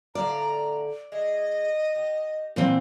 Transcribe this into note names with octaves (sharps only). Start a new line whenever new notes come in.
A2 D3 D5 F5 A#5
G#3 E4 G#4 D#5
G4
A#2 E3 C4